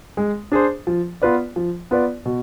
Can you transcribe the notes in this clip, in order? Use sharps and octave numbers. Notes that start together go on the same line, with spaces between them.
G#3
D4 G#4 C5
F3
B3 F4 B4 D5
F3
B3 F4 B4 D5
B2